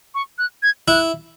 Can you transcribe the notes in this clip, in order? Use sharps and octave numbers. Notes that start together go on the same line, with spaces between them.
C#6
F#6
G#6
E4 F#6